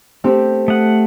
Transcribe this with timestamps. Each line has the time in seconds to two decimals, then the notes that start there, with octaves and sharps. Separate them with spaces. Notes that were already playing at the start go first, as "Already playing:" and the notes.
0.24 A3 C4 G4
0.68 A3 F#5 D#6